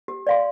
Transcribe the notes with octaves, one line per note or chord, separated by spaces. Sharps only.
G4
D5 F5 C6